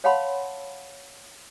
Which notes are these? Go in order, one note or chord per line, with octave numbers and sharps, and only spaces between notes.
C#5 F5 F#5 A5 B5 C6